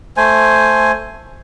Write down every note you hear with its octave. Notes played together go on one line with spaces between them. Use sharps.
A3 C5 G#5